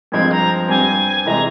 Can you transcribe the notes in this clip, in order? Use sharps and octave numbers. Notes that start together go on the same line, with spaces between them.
G2 F3 G#3 C4 G#6
A#5
G2 G3 C4 G#5
C3 E3 G#3 A#5